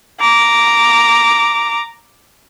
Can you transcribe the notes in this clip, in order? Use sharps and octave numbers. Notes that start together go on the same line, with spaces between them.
A#5 D6